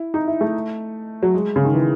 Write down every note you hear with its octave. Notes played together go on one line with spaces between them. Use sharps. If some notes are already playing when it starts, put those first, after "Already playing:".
Already playing: E4
D#4
E4
A3
F#3
G#3
C#3
D#3
E3